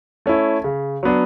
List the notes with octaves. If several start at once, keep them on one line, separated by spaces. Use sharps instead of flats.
A3 C#4 E4
C#3
F#3 B3 D4